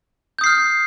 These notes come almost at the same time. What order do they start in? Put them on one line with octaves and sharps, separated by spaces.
G6 D#6 C7 F6